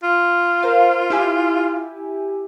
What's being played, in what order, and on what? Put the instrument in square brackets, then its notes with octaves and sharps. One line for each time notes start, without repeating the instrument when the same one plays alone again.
[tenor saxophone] F4
[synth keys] A#4 C5 F5
E4 G4 G#5